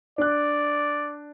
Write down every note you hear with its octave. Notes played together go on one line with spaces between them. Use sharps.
D4 D5 F#6